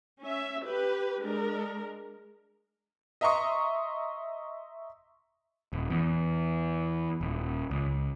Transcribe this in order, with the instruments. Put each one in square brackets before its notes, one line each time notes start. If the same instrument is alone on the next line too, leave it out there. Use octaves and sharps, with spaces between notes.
[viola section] C#4 E5
G4 B4
G#3 D4 A#4
[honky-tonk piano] D#5 E5 A#5 C6 C#6 D#6
[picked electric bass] D#1
E2
D#1
C#2